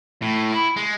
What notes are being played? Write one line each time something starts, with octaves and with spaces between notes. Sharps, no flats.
A2
E4
G#3